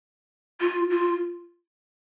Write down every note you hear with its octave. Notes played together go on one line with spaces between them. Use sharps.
F4
F4